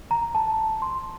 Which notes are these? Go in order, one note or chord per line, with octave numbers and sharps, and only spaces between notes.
A#5
A5
C6